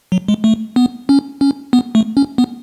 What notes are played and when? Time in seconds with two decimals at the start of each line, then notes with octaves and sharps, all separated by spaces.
0.12 F#3
0.28 G#3
0.44 A3
0.76 B3
1.09 C#4
1.41 C#4
1.73 B3
1.95 A3
2.17 C#4
2.38 B3